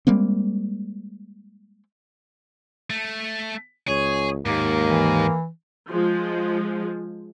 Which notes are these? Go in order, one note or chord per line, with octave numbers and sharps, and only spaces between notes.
G3 G#3 A#3 C4
A3
C#2 G#4 C#5
D#2 G#2 A#3
E3
F3 G#3